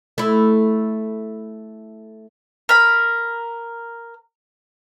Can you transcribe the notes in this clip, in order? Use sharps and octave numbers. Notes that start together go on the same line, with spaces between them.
A3 E4
A#4 B5